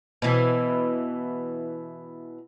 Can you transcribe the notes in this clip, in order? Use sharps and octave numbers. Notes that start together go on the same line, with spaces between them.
B2 E3